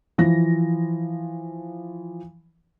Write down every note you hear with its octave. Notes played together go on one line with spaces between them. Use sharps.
E3 F3 A#6